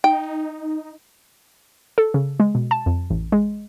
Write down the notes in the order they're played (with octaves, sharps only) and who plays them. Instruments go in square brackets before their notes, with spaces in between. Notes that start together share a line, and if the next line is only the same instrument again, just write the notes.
[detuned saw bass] D#4 [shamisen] G5
[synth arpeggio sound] A4
C#3
G#3
B2
A5
F2
A1
G#3